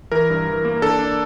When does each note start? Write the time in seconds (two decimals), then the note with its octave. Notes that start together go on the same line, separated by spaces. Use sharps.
0.12 E3 A#4
0.30 G2
0.47 E3
0.65 A#3
0.82 D4 A4
0.99 D4